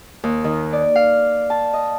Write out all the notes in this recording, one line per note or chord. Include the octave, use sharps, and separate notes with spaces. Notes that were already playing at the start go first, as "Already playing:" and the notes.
D#2
D#3
D5
F5
A5
D#5